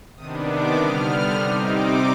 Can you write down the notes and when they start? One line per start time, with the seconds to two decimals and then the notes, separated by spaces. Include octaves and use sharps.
0.16 C3 D#3 B3 D4 D#6
0.47 D6
0.77 D3 G3 B3 F6
1.37 C3 G3 C4 D#4 D#6
1.67 D6